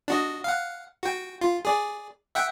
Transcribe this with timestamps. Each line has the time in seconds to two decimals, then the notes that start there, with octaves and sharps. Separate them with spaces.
0.08 D4 F#4 D#5
0.44 F5 F#5
1.03 F#4 G5
1.41 F4
1.65 G#4 D5
2.35 E5 F#5 G5